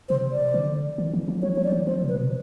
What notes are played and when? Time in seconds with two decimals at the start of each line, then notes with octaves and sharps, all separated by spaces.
0.09 C3 C5
0.32 D5
0.54 D3
0.98 D#3
1.13 E3
1.28 F3
1.42 F#3 C#5
1.56 F3 C#5
1.64 D5
1.72 E3
1.87 F3 C5
2.02 C3
2.09 B4
2.16 B2